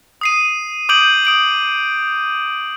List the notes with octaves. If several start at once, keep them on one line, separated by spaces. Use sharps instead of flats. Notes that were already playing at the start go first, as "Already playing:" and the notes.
D#6 C7 D#7
D6 D#6 G6 D7 F#7
D#6 D7 F#7